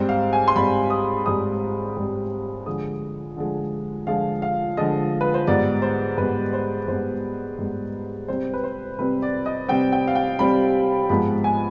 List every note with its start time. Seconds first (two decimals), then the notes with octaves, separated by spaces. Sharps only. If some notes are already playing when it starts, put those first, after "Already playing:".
Already playing: G#2 G3 C4 C5
0.09 F5
0.33 G#5
0.48 C6
0.56 G#2 G3 C4 B5
0.90 D#6
1.26 G#2 G3 C4 D#6
1.96 G#2 G3 C4
2.66 D3 F3 G#3 D#6
3.37 D3 F3 G#3
4.07 D3 F3 G#3 F5
4.42 F5
4.77 D3 F3 G#3 D#5
5.21 B4
5.34 C5
5.47 G#2 G3 B3 D5
5.82 C5
6.18 G#2 G3 B3 B4
6.53 C5
6.88 G#2 G3 B3 C5
7.58 G#2 G3 B3
8.28 C3 G3 C4 C5
8.54 B4
8.64 C5
8.99 C3 G3 C4 B4
9.22 D5
9.46 D#5
9.69 C3 G3 C4 G5
9.92 G5
10.08 F5
10.15 G5
10.39 C3 G3 C4 B5
11.09 G#2 F3 G#3 B3 B5
11.44 G#5